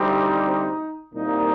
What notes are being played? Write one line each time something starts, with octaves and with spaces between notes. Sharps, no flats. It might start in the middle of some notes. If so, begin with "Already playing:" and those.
Already playing: D2 C3 G3 C4 D#4
C2 A#2 G3 A#3 D#4